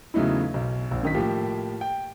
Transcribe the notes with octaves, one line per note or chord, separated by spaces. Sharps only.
E2 C#3 F#3 A3 D#4 E4
B1
A#1
F#2 D#3 B6
A2 F3 A#3 G4
G5